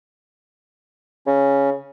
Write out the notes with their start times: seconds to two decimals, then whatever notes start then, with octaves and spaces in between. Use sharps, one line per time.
1.27 C#3 C#4